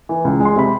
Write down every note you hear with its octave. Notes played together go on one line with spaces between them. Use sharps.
E3
C#2
G#3
C6
C3 B5